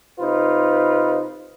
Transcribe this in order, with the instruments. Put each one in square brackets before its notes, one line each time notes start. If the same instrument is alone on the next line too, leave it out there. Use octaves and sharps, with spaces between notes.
[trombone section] C3 D#4 F4 B4 C5